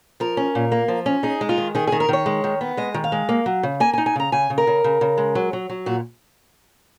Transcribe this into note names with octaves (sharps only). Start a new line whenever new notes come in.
F3 A#4
C#4
A#2
A#3
F3
C#4
D#4 G#4
G#3
F4
D#3
D#3 G#4
G#4
D#3
A#4
D#3 C#5
G#3
D#3
B3
G#3 D#5
D#3
F5
G#3
A#3
F#3
C#3
A#3 G#5
G#5
D#4
G#5
C#3 A#5
C#3 G#5
C#3
A#4
C#3
C#3
C#3
G#3
F#3
F#3
F#3
A#2 F#4